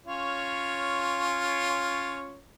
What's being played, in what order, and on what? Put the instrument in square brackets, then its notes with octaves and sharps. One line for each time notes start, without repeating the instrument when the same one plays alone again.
[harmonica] C#4 F4 C#5